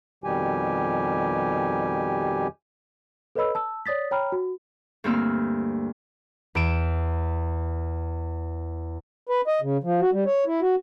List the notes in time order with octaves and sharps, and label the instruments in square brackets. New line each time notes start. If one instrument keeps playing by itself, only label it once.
[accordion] F2 B2 D#3 G3 G4 G#5
[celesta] A4 B4 C#5 D#5 B5 E6
A5 E6
C#5 D5 D#6 A6 B6
C#5 G5 A#5 B5 F6
F#4
[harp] D2 G2 A#3 C4 E6 F6
E2 D7 E7
[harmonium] B4
D#5
C#3
F3
F#4
G3
C#5
E4
F#4